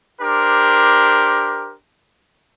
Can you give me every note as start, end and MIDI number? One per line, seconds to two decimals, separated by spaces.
0.20 1.75 62
0.20 1.75 67
0.20 1.75 70
0.20 1.75 72